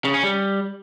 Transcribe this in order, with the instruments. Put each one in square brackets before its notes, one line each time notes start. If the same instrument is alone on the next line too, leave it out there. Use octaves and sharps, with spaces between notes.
[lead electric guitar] C#3
C#4
G3